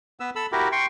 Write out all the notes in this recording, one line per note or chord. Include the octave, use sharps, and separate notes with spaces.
B3 B4 E6
A4 B5 E6
E4 F#4 G4 A#4
G5 C6 C#6